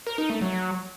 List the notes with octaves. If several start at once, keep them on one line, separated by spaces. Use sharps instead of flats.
A#4
D#4
A3
F#3